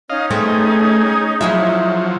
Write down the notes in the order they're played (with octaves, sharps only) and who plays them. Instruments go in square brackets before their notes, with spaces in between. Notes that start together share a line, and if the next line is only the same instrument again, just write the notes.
[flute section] C#4 D#4 C#5 [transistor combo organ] D#5 F5
[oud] A3 B3 C4 [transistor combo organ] G#4
[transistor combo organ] F3 F#3 [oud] E4 G#4 E5